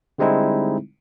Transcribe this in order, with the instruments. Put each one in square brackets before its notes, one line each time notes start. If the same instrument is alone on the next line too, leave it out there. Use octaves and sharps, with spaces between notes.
[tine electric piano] D3 G3 G#3 C4 D#4 E4